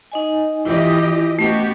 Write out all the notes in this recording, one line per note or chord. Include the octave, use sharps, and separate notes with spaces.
D#4 D#5 G#5
E3 E4 F4 G4 D#5
A3 B3 C#4 F#4 G4 D#5